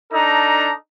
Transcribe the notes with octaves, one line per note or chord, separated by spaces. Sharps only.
D4 D#4 A4 A#5